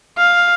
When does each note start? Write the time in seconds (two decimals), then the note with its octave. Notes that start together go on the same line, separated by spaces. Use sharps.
0.18 F5